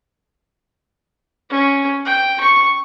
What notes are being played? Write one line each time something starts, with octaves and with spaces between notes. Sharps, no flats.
C#4
G5
C#6